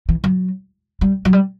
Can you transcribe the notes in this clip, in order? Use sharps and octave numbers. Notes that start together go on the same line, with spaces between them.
E3
F#3
G3
F#3
G3